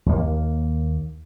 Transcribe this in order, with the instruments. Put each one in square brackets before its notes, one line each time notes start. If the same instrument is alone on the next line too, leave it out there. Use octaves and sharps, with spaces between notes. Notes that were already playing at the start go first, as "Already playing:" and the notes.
[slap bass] D#2 A#3